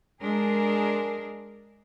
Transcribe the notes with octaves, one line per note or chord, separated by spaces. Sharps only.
G#3 D4 G#4 A#4